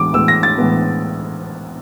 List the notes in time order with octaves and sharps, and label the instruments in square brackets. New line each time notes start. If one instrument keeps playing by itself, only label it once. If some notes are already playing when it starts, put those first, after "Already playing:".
Already playing: [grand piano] A2 E3 G#3 B3 D6
A2 E3 G#3 B3 E6
A#6
A6
A2 E3 G#3 B3